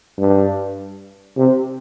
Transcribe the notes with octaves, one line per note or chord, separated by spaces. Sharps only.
G2
C3